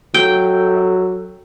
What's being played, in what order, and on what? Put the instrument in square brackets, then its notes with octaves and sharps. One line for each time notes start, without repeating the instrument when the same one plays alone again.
[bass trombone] F#3 [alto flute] A4 [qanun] G5